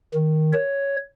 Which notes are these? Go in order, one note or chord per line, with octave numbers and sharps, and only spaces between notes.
D#3
C#5